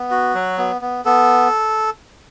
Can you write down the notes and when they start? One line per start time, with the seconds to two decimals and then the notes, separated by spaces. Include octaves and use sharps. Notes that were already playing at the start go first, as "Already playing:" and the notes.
Already playing: B3
0.11 F#4
0.34 F#3
0.58 B3
0.81 B3
1.05 B3 A4